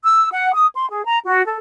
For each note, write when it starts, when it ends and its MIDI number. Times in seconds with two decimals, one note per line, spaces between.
0.04 0.29 88
0.31 0.51 78
0.53 0.66 87
0.74 0.88 84
0.90 1.05 68
1.05 1.18 82
1.25 1.44 66
1.45 1.58 69